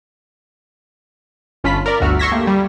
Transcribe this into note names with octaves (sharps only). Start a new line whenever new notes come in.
G1 C#4 F4 A5 B5 B6
A#4 D5
G1 D2 F#4 E5 F6
C6 C#6 E6 G#6 A#6 B6
A3 A#3 G4
G3